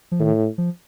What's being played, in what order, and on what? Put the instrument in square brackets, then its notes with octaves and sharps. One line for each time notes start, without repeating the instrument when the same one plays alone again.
[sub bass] F3
[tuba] A2 [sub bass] D#3
[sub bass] F3